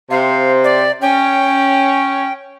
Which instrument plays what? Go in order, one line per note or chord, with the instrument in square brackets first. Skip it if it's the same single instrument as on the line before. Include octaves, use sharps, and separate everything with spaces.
[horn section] C3 C5 [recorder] F5
[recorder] D5
[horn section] C#4 [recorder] G5